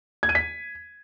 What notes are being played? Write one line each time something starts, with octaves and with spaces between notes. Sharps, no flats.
G#6
D#7
B6